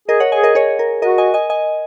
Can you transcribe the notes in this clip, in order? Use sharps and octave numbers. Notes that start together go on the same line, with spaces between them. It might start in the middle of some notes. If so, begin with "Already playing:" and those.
G#4 A#4 D#5
C#5 F#5
G#4 D#5 G#5
A#4 D#5
G#4 C#5
A#4
F#4 A#4 D#5
D#5 G#5
D#5 G#5
D#5 G#5